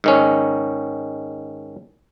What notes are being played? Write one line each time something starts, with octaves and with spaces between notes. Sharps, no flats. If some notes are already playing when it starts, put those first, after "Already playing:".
G#2 D#3 C#4